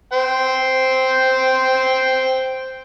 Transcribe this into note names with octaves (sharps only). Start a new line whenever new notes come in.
C5 G5